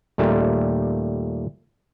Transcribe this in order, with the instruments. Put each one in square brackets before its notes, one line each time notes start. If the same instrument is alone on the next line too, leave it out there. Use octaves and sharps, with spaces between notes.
[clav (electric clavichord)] D#2 A#2 G3 A3